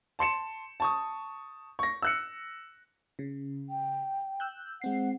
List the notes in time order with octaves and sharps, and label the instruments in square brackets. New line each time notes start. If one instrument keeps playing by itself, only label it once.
[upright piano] A5 C6 C#7 E7
A5 C#6 D#6
C#6 A#6
E6 F#6 C#7
[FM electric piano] C#3
[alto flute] G5
[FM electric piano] E6 F#6 G6
[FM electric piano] G#3 C4 C7 [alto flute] F#5